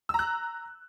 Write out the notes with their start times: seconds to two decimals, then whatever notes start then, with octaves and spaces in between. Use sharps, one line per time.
0.09 E6
0.14 A#5
0.19 F#6